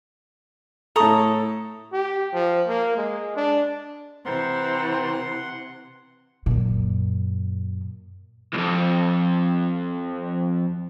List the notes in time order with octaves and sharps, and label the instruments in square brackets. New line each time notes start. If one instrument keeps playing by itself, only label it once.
[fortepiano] A2 A4 [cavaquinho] A#5 C#6 D#6
[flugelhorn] G4
F3
A#3
G#3
D4
[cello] C3 [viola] E3 [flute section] C5 G5 A#5 [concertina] F#5 C6
[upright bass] F#2 A#2
[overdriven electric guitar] C2 F2